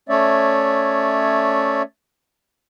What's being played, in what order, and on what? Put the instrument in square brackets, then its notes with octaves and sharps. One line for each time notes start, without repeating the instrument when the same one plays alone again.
[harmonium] A3 C#4 C#5 D5 E5